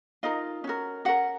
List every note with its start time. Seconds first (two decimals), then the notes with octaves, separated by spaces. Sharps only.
0.23 D#4 F4 A#4 D#5
0.64 C#4 F#4 A#4
1.05 C#4 F#4 A#4 F#5